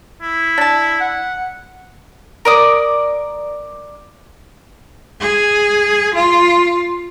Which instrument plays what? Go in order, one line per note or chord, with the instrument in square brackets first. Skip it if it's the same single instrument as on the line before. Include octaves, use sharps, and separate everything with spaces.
[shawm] E4
[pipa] D4 A5
[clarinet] F#5
[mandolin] A#4 D5 D#6
[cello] G#4
F4